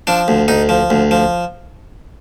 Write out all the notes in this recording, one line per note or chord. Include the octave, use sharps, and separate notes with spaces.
F3 D4
D2
D2 D#4
F3
D2
F3